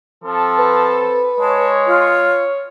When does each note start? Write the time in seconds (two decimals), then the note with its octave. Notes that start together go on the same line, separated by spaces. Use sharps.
0.24 F3 C4 A4
0.59 B4
1.40 G#3 C#5 A5
1.87 F4